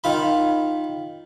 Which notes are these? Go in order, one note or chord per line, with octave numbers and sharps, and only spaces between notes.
D#3 F4 B5